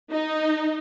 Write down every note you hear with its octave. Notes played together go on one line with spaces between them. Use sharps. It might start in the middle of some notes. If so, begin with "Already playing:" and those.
D#4